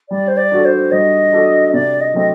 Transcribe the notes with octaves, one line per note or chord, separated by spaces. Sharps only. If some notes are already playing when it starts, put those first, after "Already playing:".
G3 D5
C5
D5
D4 F#4 A4
C5
G3 D#5
D4 F#4 A4
C3 D5
D#5
F#3 A3 C4 D#5